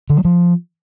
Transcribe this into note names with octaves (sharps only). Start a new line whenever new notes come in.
D3
F#3
F3